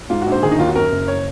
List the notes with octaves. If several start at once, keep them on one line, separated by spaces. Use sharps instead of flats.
G#2 F4
A#1 F#4
C5
D#3 G#4
D#4
D#2 F4
F#4
F#2 A#4
F#1
C#5